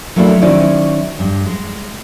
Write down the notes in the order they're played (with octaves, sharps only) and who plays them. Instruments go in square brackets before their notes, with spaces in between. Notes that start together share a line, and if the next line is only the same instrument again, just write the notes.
[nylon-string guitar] F#3 A3 A#3 C4 D4 E4
D#3 F#3 C#4 E4 C5 D5
G2
G#3